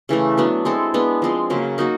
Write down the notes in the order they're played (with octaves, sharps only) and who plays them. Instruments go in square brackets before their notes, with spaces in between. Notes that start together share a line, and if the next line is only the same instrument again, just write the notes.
[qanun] C#3 E3 A3
F#3 B3 D4
G#3 C4 E4 A4
G#3 B3 D4
F3 G#3 C4
C#3 F#3 A#3
A#3 D#4 F#4